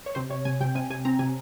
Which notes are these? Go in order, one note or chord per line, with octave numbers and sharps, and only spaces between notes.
C#5
C3 C5
C3 C#5
C3 G#5
C3 G5
C3 G#5
C3 G#5
C4 A#5
C3 G#5